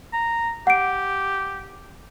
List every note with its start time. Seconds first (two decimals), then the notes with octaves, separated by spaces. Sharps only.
0.13 A#5
0.67 G4 F#5 D7